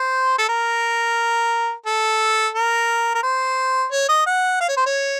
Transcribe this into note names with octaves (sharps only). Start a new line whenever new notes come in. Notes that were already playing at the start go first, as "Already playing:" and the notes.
Already playing: C5
A4
A#4
A4
A#4
A#4
C5
C#5
D#5
F#5
F5
C#5
C5
C#5